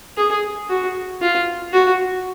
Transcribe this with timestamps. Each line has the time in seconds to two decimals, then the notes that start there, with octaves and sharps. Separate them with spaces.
0.17 G#4
0.70 F#4
1.22 F4
1.73 F#4